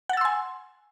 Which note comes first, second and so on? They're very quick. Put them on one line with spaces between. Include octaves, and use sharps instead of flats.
F#5 A6 E6 C6 G#5